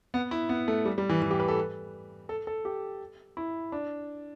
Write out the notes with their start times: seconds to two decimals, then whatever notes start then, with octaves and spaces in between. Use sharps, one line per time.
0.14 B3
0.31 E4
0.49 B3
0.68 A3
0.85 G3
0.98 G3
1.09 E3
1.22 E3
1.31 G4
1.40 B4
1.48 A4
2.29 A4
2.47 A4
2.65 G4
3.37 E4
3.72 D4